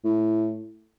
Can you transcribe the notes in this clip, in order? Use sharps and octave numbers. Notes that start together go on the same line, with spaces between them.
A2